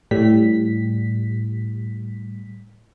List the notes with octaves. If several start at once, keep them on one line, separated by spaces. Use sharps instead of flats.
A2 G3 B6